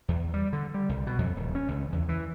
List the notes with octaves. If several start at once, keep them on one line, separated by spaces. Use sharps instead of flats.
E2
G3
D3
G3
C2
B2
F2
D#1
C#4
C#2
E2
E3